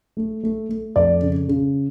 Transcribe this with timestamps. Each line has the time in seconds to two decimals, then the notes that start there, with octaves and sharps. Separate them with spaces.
0.17 A3
0.43 A3
0.69 A3
0.96 F2 D5
1.22 C#3
1.48 C#3